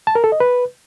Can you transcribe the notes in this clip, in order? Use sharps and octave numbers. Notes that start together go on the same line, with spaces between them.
A5
A#4
A4
D#5
B4